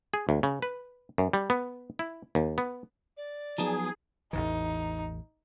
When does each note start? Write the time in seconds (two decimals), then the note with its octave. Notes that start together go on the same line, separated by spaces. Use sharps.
0.14 G#4
0.29 D2
0.43 C#3
0.62 B4
1.18 F#2
1.33 G3
1.50 B3
1.99 E4
2.35 D#2
2.58 B3
3.17 D5
3.58 F3 F#3 B3 D#4 G#4 A#5
4.33 A1 E2 E3 D#4